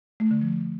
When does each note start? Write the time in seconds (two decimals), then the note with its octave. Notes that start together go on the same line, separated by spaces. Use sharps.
0.20 A3
0.31 D3
0.41 F3